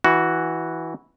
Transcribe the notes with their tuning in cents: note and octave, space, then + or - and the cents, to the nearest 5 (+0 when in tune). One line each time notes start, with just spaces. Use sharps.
E3 -10 F#4 +0